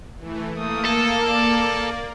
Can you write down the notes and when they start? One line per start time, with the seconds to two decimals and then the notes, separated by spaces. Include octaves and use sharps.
0.18 E3 A3
0.55 A3 A#3 D#6
0.85 A4
1.28 D5